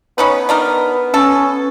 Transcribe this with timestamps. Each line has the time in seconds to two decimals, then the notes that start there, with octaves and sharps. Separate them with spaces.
0.18 B3 C#4 D#4 B4
0.49 D4 D#4 A#4
1.14 C#4 A4